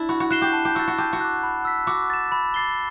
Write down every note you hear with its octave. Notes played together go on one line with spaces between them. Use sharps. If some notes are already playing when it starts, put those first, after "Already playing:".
Already playing: D4 E4
F#4 B5
F#4
F#4 F#6 C7 E7 G7
G4
A5
G4
F#4 E6 A6
F#4
G4 A5
F#4
D6 F#6
B5
E6 B6
F#4 D6
A6 E7
B5
D6 A6 C7 G7